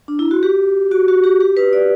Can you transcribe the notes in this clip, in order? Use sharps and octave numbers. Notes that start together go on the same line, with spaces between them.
D4
E4
F#4
G4
F#4
F#4
G4
G4
B4
D5